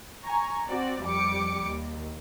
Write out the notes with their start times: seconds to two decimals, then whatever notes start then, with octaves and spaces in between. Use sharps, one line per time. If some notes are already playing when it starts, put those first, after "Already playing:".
0.23 G#5 A#5 C#6
0.68 C4 F#4 D5
1.03 F2 G3 D6 C#7
1.68 D#2